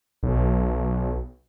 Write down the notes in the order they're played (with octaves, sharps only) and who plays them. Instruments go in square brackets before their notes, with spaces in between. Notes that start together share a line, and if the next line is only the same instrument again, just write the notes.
[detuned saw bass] B1